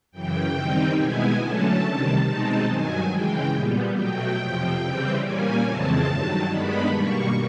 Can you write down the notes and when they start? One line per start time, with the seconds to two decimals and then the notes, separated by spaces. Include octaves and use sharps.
0.12 F#2 C#3 E3 G5
0.54 D#3 G3 C4 D#4
0.96 B2 G#3 B3 E4 G#5
1.39 D3 F#3 A3 C#4 A5
1.81 C3 D#3 G3
2.24 B2 G#3 C4 D#4 A5
2.66 G2 D#3 F#3 G#5
3.09 C#3 E3 G#3 G5
3.52 A#2 G3 B3
3.95 B2 F#3 A3 G5
4.37 F2 C3 F3
4.80 C#3 E3 G3 C4
5.22 A#2 G3 A#3 C#4 G#5
5.64 F2 C#3 E3 G#3 C4 A5
6.07 G2 D#3 F#3
6.49 G2 D#3 G#3 B3 D4 B5
6.92 B2 G3 A#3 C#6